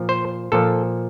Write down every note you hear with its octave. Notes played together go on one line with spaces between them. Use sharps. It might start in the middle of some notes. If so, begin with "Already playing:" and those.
Already playing: A#2 F3
C5
A#2 F3 A4